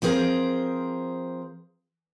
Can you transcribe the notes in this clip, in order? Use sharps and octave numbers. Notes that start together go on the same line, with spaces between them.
F3 C4 G#4 A#4 C5